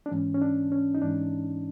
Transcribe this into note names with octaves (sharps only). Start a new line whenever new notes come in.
D4
G#2 E3 C#4
C#4
D4
C#4
D#4
G#2 E3 D4